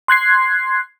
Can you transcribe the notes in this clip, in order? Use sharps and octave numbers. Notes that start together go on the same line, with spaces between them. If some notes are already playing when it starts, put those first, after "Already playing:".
C6 F#6 G#6 C7